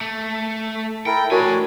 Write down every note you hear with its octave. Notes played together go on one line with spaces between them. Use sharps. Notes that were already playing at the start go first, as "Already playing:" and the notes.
A3
E4 A4 A#4 G5
A3 D4 F#4 A#4 C#5 D5 G#5